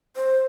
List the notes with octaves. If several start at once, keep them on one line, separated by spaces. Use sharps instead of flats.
C5